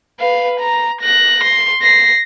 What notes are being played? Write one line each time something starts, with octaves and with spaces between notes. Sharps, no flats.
B4 F5
A#5
F#6 A#6
C6
A#6 C7